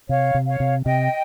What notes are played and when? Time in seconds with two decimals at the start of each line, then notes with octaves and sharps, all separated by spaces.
0.09 C3 C#5 F5
0.34 C3
0.47 C#5 F5
0.60 C3
0.85 C3 D#5 G5